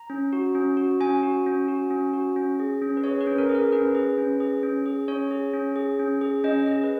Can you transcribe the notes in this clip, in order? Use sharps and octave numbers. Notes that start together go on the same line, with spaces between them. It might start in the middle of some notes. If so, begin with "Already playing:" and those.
Already playing: A#5
C#4
F#4
C#4
F#4
C#4 G#5
F#4
C#4
F#4
C#4
F#4
C#4
G#4
C#4
B4
G#4 C#5
B4
C#4
A#4
G#4
A#4
C#4 B4
G#4
C#4
G#4
C#4
G#4
C#4 C#5
G#4
C#4
G#4
C#4
G#4
C#4 D#5
G#4 D#5
B4